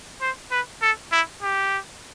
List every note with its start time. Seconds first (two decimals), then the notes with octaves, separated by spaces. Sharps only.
0.21 C5
0.51 B4
0.82 A4
1.12 E4
1.42 G4